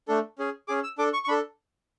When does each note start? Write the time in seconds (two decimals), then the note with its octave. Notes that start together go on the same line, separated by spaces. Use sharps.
0.08 A3 D4 A4
0.38 C#4 G#4
0.68 C#4 G#4 D6
0.84 E6
0.98 D4 A4 D6
1.13 C#6
1.24 C#6
1.28 D4 B5
1.31 A4